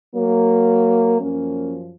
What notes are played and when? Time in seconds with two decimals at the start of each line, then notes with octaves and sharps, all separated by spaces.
0.15 F#3 A#3
1.20 F#2 F3 A#3 C#4